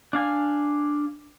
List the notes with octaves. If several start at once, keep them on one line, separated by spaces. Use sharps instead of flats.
D4 F5 G#5